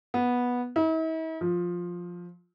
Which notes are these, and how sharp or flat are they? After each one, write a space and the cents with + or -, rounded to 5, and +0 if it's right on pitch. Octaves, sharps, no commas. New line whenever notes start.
B3 -10
E4 -45
F3 +10